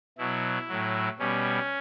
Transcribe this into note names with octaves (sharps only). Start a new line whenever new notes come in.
B2 F#3 E4
A2 F#3
B2 G3 C#4